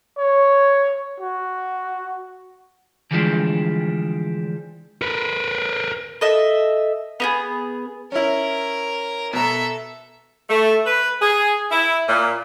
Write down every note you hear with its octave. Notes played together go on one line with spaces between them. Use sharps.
C#5
F#4
D3 E3 F3 G3 G#3 D4
A#4 B4
A4 D#5 E5
B3 G4 G#4
C#4 E4 A#4
B2 A4 E5 A#5
A3
B4
G#4
E4
A#2